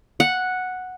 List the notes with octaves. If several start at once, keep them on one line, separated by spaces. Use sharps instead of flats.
F#5